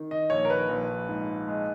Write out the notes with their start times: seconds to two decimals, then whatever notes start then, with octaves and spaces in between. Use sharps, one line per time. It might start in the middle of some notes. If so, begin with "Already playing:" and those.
Already playing: D#3
0.11 D#5
0.30 A#1 C#5
0.45 A#4
0.50 B4
0.69 A#1
1.08 G#2
1.48 G#3